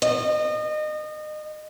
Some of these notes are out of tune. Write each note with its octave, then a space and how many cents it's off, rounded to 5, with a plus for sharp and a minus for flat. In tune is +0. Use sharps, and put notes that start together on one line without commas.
D#5 -30